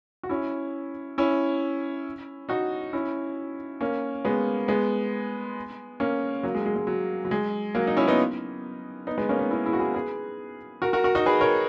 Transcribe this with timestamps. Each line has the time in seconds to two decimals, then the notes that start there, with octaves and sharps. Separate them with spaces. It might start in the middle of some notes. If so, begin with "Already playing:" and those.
0.23 F#4
0.29 C#4 E4
1.18 C#4 E4
2.49 D#4 F#4
2.93 C#4 E4
3.81 A#3 C#4
4.25 G#3 B3
4.68 G#3 B3
6.00 A#3 C#4
6.43 F#3 A#3
6.55 G#3
6.66 G#3
6.76 G#3
6.87 F#3
7.25 F#3
7.31 G#3
7.75 F#3 A#3
7.87 D#4
7.97 C#4 E4
8.08 B3 D#4
9.07 B3 D#4
9.18 G#3 B3
9.29 A#3 C#4
9.39 B3 D#4
9.51 C#4 E4
9.65 E4 G#4
9.73 F#4
9.79 E4 G#4
9.94 G#4 B4
10.82 F#4 A#4
10.93 F#4 A#4
11.04 F#4 A#4
11.15 D#4 F#4
11.26 G#4 B4
11.41 A#4 C#5